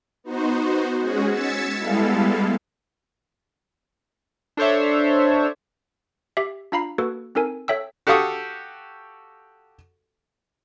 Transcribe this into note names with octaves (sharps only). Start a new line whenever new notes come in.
B3 D#4 F#4 C5
G#3 C#4 F#4 G#4
E6 G#6 A6 B6 C#7 E7
G3 G#3 B3 E4 A4 F5
D4 A4 C5 C#5 E5
G4 E5
D4 F4 F5 A#5 B5 C7
A#3 F#4 A4 B4
C4 D#4 A4 A#4 G#5
A4 C#5 E5 G5 E6
F#4 G4 A4 F5 C#6 D#6